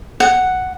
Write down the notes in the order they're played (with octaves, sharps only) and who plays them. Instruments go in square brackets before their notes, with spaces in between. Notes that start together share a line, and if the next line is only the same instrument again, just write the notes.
[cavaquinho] F#5